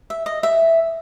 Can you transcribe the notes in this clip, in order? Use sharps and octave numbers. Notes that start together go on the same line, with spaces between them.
E5
D#5
E5